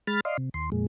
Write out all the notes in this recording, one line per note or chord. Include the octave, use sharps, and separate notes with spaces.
G#3 B5 F6 A6
D5 D#5 F5 C6
C3
D#2 C6
F2 A#2 G#3